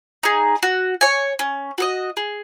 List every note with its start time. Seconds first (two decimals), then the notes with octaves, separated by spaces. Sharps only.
0.23 D#4 G#4
0.63 F#4
1.01 C#5 G#5
1.39 C#4
1.78 F#4 A4 D#5
2.17 G#4